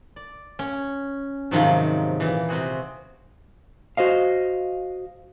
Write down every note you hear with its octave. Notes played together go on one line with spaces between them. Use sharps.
D5
C#4
G#2 C3 D#3 F3 F#3
A#2 E3
C3 C4 F#4 G#4
F#4 C5 D#5 F5